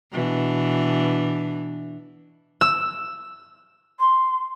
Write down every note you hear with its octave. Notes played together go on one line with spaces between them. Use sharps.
B2 E3 D4
E6
C6